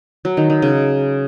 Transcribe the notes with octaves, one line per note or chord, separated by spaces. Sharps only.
F#3
D#3
D#3
C#3